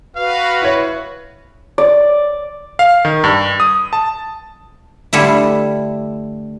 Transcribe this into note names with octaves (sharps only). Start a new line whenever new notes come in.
F#4 B4 F5
E4 C#5
D5
F5
D#3
G2
D#6
A5
D3 G3 A3 D4 E4